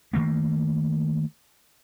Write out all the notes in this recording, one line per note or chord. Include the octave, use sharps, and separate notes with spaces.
D#3 F3 A3 A#3